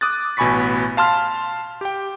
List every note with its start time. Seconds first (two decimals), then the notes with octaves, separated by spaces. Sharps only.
0.01 D6 D#6 F#6 A6
0.37 A1 B2 G#5 B5 C#6 B6
0.97 F5 A5 C6 F6
1.81 G4 G5